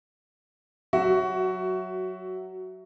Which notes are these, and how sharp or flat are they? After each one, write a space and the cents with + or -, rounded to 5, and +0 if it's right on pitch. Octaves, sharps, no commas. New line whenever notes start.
F#3 +0 F#4 +15 E5 +0